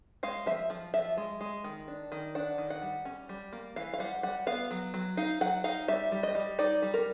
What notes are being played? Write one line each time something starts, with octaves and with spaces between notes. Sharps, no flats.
G#3 F5
F3 E5
F3
F3 E5
G#3
G#3
D#3
D4
D#3
D4 F#5
D#3
F#5
G3
C#4
G3
A#3
E3 F5
F5
G3 F#5
G3 F#5
B3 F5
F#3
F#3
D#4 F5
F#3 F#5
D#4 F5
G3 E5
G3
D#5
G3
D#4 D5
G3
A#4